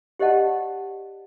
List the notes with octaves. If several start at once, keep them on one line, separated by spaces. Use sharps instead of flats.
G4 C5 D5 D#5 F#5 A5